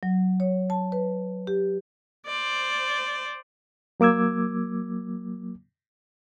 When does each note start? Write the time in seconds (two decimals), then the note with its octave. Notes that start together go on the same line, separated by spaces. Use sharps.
0.03 F#3
0.40 C#5
0.70 A5
0.92 B4
1.47 G4
2.27 C5 D5
4.00 F#3 A#3 D6 E6 G#6